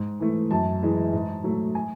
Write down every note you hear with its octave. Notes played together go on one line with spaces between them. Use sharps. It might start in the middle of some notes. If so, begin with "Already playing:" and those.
Already playing: G#2
E3 A3
F#2 A5
E3 G#3
G#2
F#3 A3
G#5